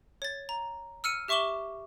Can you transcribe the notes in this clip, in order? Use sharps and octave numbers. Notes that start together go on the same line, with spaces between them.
C#5 A6
A#5
E6 F6 C#7 D#7
G4 E5 C#6 D6 E7 G7